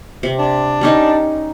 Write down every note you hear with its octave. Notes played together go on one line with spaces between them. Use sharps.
C3
D4
G3 C#4 D#4